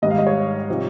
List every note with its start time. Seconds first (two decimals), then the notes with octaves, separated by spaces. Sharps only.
0.02 G#2 D#3 G3 D#5
0.11 F5
0.18 D#5
0.27 C#5
0.69 C3 F3 C4 D#4